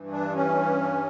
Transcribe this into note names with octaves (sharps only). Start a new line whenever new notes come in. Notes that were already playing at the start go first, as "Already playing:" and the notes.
Already playing: G2 E3
D4
C#4